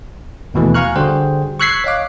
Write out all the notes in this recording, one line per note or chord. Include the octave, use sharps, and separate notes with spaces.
D#2 B2 E3 A3
F5 G#5 A#5 C#6 F6 F#6
D3 G3 F#4 G#4 C5 G5
C#6 E6 F#6 G#6 B6 C7
C#5 D#5 F5 D6